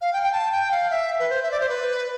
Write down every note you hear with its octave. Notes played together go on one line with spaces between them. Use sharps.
F5
G5
G5
A5
G5
F5
E5
B4
C5
E5
D5
C5
B4